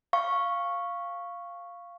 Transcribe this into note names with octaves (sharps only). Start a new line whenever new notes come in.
F5 C#6